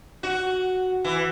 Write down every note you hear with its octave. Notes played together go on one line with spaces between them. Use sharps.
F#4
E3